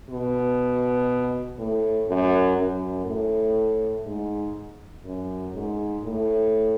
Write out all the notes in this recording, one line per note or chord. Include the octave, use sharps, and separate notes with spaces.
B2
A2
F#2
F#2
A2
G#2
F#2
G#2
A2